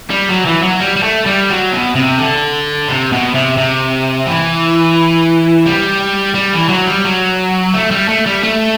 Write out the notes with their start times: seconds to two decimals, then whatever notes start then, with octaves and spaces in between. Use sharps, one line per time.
0.10 G3
0.29 F#3
0.45 E3
0.63 F#3
0.80 G3
0.96 G3
1.03 A3
1.26 G3
1.50 F#3
1.73 B2
1.96 C3
2.19 D3
2.88 C3
3.12 B2
3.34 C3
3.57 C3
4.27 E3
5.66 G3
6.35 G3
6.53 E3
6.69 F#3
6.87 G3
7.05 F#3
7.74 A3
7.91 G3
8.08 A3
8.26 G3
8.43 A3